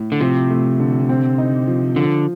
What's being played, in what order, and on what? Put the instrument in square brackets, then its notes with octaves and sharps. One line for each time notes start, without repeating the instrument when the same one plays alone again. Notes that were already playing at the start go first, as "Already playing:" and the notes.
Already playing: [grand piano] A2
[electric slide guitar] D3
[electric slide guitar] C3 [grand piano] F3
[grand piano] A3
D3
C4
D#4
F3
[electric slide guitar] D3 [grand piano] F3